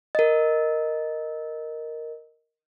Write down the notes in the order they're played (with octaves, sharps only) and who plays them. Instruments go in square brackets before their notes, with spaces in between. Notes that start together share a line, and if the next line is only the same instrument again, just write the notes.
[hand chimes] A#4 D#5